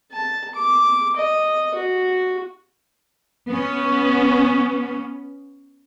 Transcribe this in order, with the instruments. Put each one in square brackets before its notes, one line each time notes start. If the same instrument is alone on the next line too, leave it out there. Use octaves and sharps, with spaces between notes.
[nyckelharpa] A5
D6
D#5
F#4
[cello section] B3 C#4